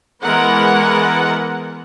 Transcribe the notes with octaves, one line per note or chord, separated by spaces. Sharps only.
E3 G#3 B3 A#4 F#5